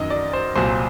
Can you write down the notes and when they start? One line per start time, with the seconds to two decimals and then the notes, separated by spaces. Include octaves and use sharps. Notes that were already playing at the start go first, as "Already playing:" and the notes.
Already playing: F#2 D#3 F#3 D#5
0.10 D5
0.33 C5
0.55 C2 A#2 F#3 C5